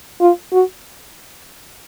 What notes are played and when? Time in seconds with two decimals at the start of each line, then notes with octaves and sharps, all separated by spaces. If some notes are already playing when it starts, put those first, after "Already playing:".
0.21 F4
0.53 F#4